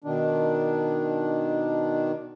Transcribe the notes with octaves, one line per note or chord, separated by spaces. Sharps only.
B2 D#3 D4